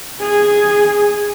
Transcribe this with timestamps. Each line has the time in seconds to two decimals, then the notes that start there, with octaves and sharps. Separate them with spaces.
0.20 G#4